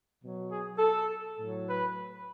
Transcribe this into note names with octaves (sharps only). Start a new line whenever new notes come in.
B2 F#3
G#4
A4
A2 F#3
B4